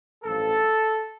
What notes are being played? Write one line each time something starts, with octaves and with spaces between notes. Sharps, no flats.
A1 G2 F3 A4